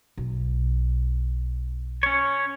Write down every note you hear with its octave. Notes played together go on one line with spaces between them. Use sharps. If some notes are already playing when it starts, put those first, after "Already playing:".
B1
C#4 C#5